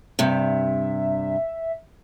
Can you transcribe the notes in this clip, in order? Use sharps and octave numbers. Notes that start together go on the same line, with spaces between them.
G2 C3 E5